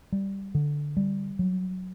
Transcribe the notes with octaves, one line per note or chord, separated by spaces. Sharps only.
G3
D3
G3
F#3